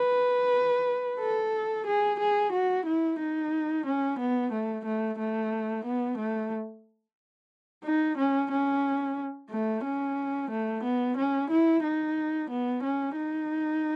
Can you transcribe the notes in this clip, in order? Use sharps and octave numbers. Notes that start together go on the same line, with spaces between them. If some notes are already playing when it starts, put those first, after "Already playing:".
Already playing: B4
A4
G#4
G#4
F#4
E4
D#4
C#4
B3
A3
A3
A3
B3
A3
D#4
C#4
C#4
A3
C#4
A3
B3
C#4
E4
D#4
B3
C#4
D#4